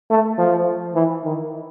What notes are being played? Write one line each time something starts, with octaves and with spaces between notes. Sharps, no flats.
A3
F3
E3
D#3